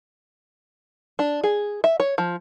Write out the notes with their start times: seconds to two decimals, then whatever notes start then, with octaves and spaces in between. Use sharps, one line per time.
1.19 D4
1.43 G#4
1.84 E5
2.00 C#5
2.18 F3